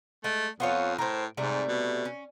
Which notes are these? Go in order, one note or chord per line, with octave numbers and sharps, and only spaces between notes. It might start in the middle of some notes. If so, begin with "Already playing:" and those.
G#3 A3
F2 B3 F4 C#5
A2 A#4 C5
G#2 C3 G3 A3
B2
C#4